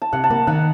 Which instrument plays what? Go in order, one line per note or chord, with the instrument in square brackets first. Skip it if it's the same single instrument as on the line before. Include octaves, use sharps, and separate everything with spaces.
[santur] A5
[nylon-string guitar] C3 [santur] F#5
[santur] A5
[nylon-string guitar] A#3 [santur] F#5
[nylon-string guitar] D#3 [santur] F#5